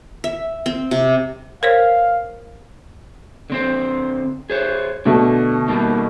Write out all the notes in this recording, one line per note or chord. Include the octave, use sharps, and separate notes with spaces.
E5
C4
C3
A#4 C5 C#5 F5
D3 C4 C5
G#4 C5 C#5
B2 D3 A3
G3 A#3 D#4